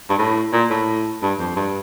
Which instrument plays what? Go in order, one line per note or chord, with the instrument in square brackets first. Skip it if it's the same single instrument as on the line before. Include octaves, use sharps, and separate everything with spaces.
[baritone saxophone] G2
A2
A#2
A2
G2
F2
G2